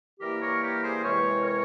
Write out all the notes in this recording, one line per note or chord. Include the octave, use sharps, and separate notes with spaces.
E3 G3 A#3 G4 A#4
A#4 C#5
G4 A#4
G#4 C5
C3 E3 G#3 A#4 C#5
A#4 C#5